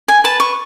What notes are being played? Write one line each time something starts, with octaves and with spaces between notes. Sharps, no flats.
G#5
B4 A5
C#6